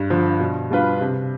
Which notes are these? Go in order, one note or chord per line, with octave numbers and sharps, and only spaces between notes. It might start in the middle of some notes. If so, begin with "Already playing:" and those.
Already playing: G2
D3 F3
B2
G3 D4 F4 B4
C3